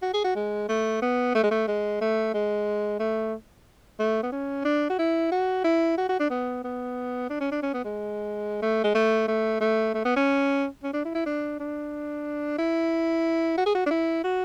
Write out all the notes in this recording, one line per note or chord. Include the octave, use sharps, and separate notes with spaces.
F#4
G#4
F#4
G#3
A3
B3
A3
G#3
A3
G#3
A3
G#3
A3
A3
B3
C#4
D4
F#4
E4
F#4
E4
F#4
F#4
D4
B3
B3
D4
C#4
D4
C#4
B3
G#3
A3
G#3
A3
A3
A3
A3
B3
C#4
C#4
D4
E4
E4
D4
D4
E4
F#4
G#4
F#4
D4
E4
F#4